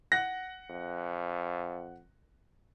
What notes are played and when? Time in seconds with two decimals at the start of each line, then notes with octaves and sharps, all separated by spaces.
0.12 F#5 F#6 A#6
0.70 F2